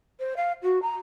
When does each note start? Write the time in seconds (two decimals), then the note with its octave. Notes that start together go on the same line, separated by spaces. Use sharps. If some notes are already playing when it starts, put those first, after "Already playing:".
0.20 C5
0.37 F5
0.62 F#4
0.82 A#5